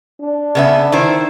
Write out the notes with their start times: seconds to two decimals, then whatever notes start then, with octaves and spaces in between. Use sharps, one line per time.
0.21 D4
0.55 C#3 B3 E5
0.92 D#3 E4 C5